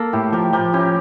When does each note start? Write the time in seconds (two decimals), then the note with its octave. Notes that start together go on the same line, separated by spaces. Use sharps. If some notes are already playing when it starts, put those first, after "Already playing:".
Already playing: A#3 A4
0.13 A2 E4 G4
0.33 F3 G4 A#4
0.53 F3 G4 A#4
0.73 C#4 E4 G4